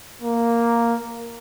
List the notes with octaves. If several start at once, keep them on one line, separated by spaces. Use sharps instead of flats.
A#3